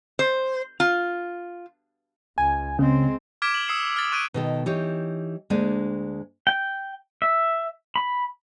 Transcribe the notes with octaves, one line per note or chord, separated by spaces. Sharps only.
C5
F4
C#2 G#5
C#3 G#3 C4
D6 F6 G#6 B6 D7 E7
F#7
D#6 E6 C7 C#7 E7
F6 A6
C#6 F#6 A6 D7 D#7
B2 D#3 A4
E3 D#4 G4 C#5
D2 G#3 A#3 D4 D5 G#5
G5
E5
B5